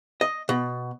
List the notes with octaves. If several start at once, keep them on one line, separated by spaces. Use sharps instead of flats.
D#5
B2